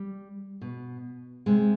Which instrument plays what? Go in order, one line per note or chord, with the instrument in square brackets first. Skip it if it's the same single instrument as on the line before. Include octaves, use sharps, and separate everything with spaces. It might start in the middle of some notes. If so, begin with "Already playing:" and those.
Already playing: [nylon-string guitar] G3
B2
C3 G#3